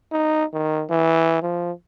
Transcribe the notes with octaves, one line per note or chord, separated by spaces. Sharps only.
D#4
D#3
E3
F3